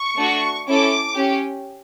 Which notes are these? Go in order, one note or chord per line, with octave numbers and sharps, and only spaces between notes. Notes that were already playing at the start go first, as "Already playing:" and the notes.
Already playing: C#6
A3 D4 F#4
C#4 E4 A4 D6
C#4 G4